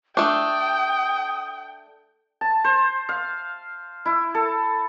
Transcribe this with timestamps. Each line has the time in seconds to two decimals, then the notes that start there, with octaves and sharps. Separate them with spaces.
0.17 A3 D4 G5 D#6
2.41 A5
2.64 C5
3.09 F5
4.06 E4
4.35 A4